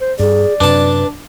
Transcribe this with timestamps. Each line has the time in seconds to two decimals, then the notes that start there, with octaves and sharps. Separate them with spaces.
0.01 C5
0.19 G2 G#4 D5
0.60 F#2 C3 D4 B4 A5